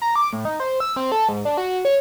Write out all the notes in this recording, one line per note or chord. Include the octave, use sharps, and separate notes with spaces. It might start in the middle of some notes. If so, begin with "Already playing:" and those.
A#5
D6
A2
D#4
C5
E6
C4
A4
G#2
D4
F#4
C#5